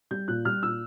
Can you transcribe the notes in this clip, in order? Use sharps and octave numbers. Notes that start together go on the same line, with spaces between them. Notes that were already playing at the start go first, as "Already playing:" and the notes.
G3 G6
A#2 F#6
G3 F6
A#2 E6